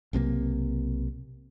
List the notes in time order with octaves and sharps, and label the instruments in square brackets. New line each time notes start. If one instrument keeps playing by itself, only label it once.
[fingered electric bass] B1 C3 D#3 A#3